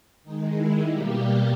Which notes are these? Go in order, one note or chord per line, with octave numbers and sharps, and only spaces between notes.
D#3 G#3 D#4
E4
B2 G3 A#3 G4